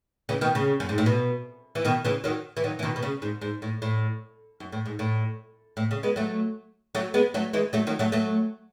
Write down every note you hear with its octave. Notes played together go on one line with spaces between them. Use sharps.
C#3 E3
B2 D#3
C#3
F#2
G#2
A2
B2
E3
B2 D#3
C#3 E3
D#3 F#3
E3
D#3 F#3
E3
B2 D#3
B2
C#3
G#2
G#2
A2
A2
F#2
A2
G#2
A2
A2
C#3
G#3 B3
F#3 A3
F#3 A3
G#3 B3
F#3 A3
E3 G#3
F#3 A3
D#3 F#3
F#3 A3
F#3 A3